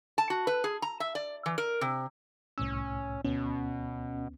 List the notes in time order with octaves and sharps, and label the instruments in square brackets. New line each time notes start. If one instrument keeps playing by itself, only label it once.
[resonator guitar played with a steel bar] A5
F#4
B4
G#4
A#5
E5
D5
E3
A#4
C3
[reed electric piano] C2 A2 E6 [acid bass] C#4
[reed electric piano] D2 B3 [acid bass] B2 [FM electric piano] C#4